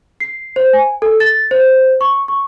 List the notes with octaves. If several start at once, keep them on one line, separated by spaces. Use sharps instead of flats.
C7
C5
G#5
A4
A6
C5
C#6
C#6